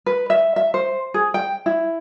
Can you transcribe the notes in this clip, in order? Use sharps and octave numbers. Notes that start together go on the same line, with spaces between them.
B4
E5
E5
C5
G#4
G5
E4